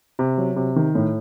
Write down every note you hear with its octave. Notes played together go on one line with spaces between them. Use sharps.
C3
F#3
C3
D#3
A2